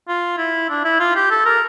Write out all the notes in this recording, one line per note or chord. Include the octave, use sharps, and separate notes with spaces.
F4
E4
D4
E4
F4
G4
A4
A#4